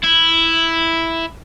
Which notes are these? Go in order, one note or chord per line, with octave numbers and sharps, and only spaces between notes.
E4